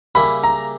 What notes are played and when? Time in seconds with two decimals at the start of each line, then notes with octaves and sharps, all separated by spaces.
0.15 C#3 G3 A#3 E4 G4 B5
0.43 A#5